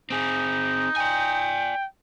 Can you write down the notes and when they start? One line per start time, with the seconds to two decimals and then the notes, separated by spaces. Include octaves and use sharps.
0.10 C4 D#4 G#4
0.97 D5 G5 G#5